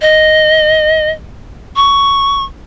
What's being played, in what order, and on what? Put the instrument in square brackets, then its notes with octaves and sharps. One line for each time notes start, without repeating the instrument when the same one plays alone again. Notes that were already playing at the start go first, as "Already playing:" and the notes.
[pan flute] D#5
C#6